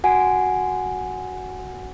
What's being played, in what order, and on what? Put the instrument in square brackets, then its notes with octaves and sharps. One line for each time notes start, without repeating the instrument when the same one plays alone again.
[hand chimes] F#4 F#5 G#5